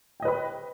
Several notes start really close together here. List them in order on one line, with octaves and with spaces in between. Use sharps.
G5 D#5 B4 B5